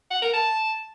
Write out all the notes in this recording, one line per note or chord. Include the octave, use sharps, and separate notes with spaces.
F#5
A#4
A5